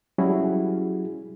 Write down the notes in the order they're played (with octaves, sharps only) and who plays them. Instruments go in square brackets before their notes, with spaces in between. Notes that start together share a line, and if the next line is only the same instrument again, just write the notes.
[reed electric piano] F#3 G3 C#4 E4 F#4 G#4